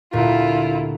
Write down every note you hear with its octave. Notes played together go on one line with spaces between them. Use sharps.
D2 A#2 E4 F4 G4